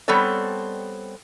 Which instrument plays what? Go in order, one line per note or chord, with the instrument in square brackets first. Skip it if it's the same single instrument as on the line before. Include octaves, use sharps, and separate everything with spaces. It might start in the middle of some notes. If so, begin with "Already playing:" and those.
[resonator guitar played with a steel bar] G3 B3 C4 A4 C#5